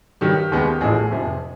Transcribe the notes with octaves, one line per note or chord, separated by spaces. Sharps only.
G2 D#3 F#3 G4
D#2 D#3 G#3 B3
A1 A2 F3 G#4
F1 F2 C3 F3